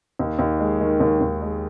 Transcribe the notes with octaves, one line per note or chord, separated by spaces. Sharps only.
D#2
D#2
G#3
D#3
D#2
D#2
G#3